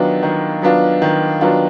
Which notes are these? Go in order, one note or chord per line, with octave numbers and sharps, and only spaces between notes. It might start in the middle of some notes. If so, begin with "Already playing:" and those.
Already playing: D#3 F#3 B3 D4 F4
D#3
F#3 B3 D4 F4
D#3
F#3 B3 D4 F4